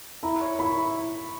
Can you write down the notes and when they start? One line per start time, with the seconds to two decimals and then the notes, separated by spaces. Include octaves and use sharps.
0.23 E4 A#5
0.41 C#5
0.59 E4 B5
0.77 E4